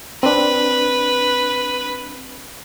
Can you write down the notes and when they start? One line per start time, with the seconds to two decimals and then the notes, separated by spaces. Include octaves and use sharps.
0.23 C4 D4 B4